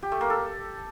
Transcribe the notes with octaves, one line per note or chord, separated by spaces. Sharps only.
G4
A3
A#3
A4